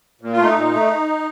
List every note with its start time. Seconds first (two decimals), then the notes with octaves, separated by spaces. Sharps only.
0.21 A#2
0.33 F4
0.38 A3
0.44 D#4
0.55 A#2
0.72 A3